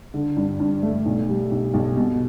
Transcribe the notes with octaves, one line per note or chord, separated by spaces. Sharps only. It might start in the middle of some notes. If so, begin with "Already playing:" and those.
D3
G2
G2
A3
B1
G3
B1
B1
B2